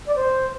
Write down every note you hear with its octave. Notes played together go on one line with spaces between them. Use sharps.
D5
C5